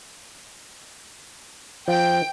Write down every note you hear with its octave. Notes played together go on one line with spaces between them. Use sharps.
F3 G5